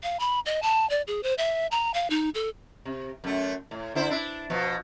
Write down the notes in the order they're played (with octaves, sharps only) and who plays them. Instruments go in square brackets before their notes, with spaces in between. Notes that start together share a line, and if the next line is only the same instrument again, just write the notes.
[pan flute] F5
B5
D#5
A5
D5
G#4
C5
E5
A#5
F5
D#4
A4
[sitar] C3
F#2 A3
A2
D3 E4 C5
D4 E4 E5
B2 F3